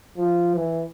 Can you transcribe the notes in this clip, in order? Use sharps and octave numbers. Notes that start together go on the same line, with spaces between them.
F3
E3